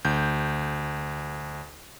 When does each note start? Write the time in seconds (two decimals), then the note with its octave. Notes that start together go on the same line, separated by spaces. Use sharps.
0.05 D2 G6